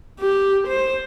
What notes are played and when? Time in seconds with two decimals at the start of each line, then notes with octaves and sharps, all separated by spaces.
0.20 G4
0.68 C5